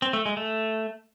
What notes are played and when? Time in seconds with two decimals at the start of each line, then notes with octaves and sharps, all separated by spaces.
0.02 C4
0.13 A3
0.26 G#3
0.37 A3